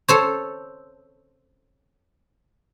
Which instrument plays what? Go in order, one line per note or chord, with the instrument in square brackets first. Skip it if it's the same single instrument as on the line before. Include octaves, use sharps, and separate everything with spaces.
[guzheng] A4 C5 C#5